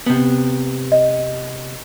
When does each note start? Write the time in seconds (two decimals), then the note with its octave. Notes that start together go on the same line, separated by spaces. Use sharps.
0.06 C3 B3
0.92 D#5